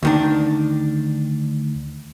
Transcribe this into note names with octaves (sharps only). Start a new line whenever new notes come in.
D2 D#3 D4